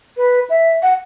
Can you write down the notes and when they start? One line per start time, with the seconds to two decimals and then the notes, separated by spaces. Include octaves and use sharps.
0.17 B4
0.49 E5
0.82 F#5